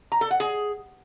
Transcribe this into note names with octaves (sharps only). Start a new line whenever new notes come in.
A#5
A4
F#5
G#4